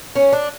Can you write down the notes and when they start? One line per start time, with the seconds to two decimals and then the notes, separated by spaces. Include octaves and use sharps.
0.15 C#4
0.33 D4